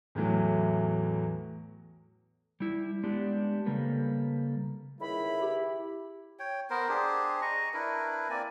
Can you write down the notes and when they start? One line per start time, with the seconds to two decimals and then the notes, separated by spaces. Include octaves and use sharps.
0.15 E2 A2 E3 F#3
2.60 G3 E4
3.03 G#3 B3 D4 G4
3.66 C#3 G3 A#3 A4 B4
5.01 C#2 D#3 E4 B5
5.42 G4
6.39 C#5 G5
6.70 B3 A#4 C5
6.89 D4 G4 G#4 C5
7.42 D#5 A#5 C#6
7.74 D4 E4 A#4 B4
8.29 A#3 C4 D5 G#5